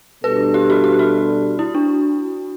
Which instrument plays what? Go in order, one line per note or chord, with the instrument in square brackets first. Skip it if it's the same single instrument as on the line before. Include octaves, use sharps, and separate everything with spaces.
[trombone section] B2 G3 D4 A4 [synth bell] B4
[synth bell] G4
F#4
G4
F#4
E4
D4